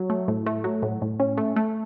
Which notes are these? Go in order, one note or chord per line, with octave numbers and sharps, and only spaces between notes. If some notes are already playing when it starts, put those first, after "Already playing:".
Already playing: F#3
A3
A2
A3
F#3
A2
A2
C#4
A3
A3